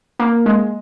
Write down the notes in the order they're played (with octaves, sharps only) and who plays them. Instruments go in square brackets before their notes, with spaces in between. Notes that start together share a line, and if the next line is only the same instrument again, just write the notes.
[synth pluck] A#3
G#3